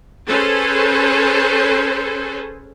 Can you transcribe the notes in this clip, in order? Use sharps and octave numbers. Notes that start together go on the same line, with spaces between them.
C#4 G#4 A4 B4 C5